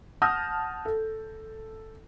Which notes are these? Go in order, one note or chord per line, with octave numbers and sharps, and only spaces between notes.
F#5 A5 D#6 F6 G6 A#6
A4